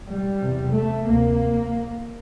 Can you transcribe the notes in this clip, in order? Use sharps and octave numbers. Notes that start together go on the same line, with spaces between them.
G3
E2 C3
A3
D2 C3 A#3